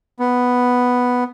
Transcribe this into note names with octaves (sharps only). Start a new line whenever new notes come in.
B3